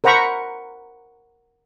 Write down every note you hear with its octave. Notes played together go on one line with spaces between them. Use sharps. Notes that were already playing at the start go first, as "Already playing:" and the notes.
A#4 C5 F#5 A#5 B5 C#6